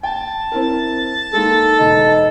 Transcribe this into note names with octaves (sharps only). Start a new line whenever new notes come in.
G5 A5
C4 E4 A#4
G#3 A#3 D#4 A4
E1 D#4 D#5